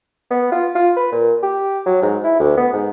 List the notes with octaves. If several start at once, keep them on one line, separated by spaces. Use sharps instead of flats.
B3
F4
F4
B4
A#2
G4
F#3
G#2
E4
D2
B3
G#2